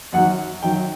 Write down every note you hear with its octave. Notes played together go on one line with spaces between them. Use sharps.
F#2 D#3 F#3 F#5
F#2 D#3 F#3 G5